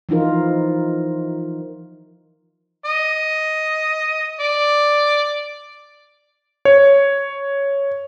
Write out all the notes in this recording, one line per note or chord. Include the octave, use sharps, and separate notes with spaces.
E3 F3 D#4 F4 A#4
D#5
D5
C#5